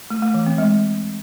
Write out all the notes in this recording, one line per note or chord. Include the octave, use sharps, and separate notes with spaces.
A3
A3
E3
C4
G#3